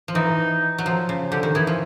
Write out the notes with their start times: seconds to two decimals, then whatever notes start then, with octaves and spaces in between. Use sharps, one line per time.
0.08 F3
0.15 E3 D#4
0.78 F#3
0.86 F3
1.09 C#3
1.32 D3 G4
1.43 D#3
1.55 E3 G#4
1.67 F3